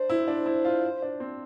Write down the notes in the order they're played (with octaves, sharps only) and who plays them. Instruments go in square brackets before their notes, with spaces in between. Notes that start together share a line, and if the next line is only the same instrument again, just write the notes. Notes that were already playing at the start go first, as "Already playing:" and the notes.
Already playing: [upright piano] D4 [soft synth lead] C5
[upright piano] E4
D4
E4
F4
D4
C4